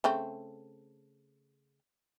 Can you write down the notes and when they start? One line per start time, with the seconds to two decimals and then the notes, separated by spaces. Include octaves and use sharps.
0.04 C#3 A3 C4